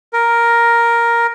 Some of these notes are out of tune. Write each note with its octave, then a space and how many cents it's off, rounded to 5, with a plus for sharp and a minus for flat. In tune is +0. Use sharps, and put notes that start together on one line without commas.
A#4 +5